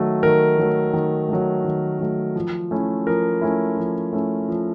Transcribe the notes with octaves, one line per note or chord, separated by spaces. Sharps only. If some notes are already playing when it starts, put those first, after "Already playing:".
Already playing: D#3 F#3 A3
D#3 A#4
F#3 A3
D#3
F#3 A3
D#3
F#3 A3
F3
A3 C#4 E4
F3 A#4
A3 C#4 E4
F3
A3 C#4 E4
F3